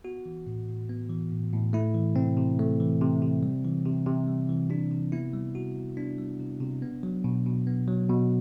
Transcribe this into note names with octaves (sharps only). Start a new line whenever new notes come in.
B3 F#4
E3
A2
A2
B3
E3
A2
A2
A3 E4
E3
C3 C4
C3
A3
E3
C3
C3
G3
E3
C3
C3
G3
E3
C3 D4
C3
B3 E4
G3
C3 F#4
C3
B3 D4
G3
C3
C3
B3
F#3
B2
B2
B3
F#3
B2